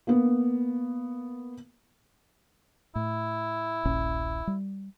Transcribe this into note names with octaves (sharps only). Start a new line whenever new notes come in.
A#3 B3
A2 E4
D#1 A#1 C#4
G3